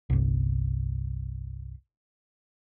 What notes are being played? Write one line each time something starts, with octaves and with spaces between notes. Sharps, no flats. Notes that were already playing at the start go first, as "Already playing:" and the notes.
G1 C2